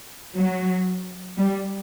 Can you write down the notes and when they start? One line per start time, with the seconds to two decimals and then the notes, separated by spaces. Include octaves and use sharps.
0.37 F#3
1.38 G3